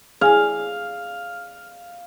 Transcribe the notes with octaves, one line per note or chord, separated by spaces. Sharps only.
G#4 F5 G#5 F6